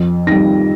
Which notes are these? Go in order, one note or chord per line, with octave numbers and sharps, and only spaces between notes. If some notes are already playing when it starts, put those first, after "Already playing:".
Already playing: F2
D#3 G3 A#6